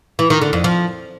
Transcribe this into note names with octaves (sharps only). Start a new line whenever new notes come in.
E3
D#3
D3
F2
F3